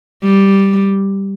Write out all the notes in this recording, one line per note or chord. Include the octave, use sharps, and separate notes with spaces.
G3